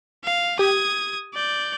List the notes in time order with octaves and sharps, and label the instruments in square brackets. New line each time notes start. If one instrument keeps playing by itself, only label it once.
[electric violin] F5
[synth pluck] G4 [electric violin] D#6 G#6
[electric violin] D5 G6